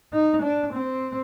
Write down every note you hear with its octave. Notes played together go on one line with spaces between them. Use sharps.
D#4
D4
C4